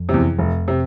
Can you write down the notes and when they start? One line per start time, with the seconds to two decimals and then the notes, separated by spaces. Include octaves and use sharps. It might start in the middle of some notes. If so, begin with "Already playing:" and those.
Already playing: F2
0.09 E2 C3
0.39 F1
0.68 C3